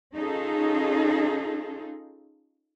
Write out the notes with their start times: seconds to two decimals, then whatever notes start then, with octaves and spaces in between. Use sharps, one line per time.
0.14 C#4 D#4 F4 G#4 A4